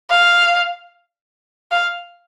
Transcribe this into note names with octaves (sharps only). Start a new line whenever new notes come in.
F5
F5